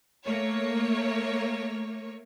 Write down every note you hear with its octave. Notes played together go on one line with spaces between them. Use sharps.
A3 A#3 C#5